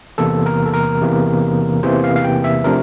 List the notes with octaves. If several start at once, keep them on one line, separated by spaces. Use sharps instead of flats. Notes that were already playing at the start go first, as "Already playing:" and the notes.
E2 C3 E3 A#3 A4
A#4
A4
A#4
E2 C3 E3 A#3
E2 C3 E3 A#3 C5
F5
F5
G5
E5
C3 F3 A3 D4 A#4